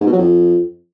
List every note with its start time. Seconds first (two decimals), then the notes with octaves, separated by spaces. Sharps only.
0.01 G#2
0.07 B2
0.12 F#3
0.18 F2